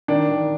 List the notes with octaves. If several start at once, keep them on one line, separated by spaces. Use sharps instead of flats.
D#3 D4
D#3